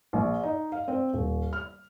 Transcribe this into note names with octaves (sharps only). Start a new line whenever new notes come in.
A#1
D#4
F5
C4
D#1
F6